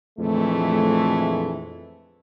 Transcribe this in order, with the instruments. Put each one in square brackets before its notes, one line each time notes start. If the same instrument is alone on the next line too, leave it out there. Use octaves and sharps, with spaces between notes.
[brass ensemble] A#1 F2 E3 G#3 A3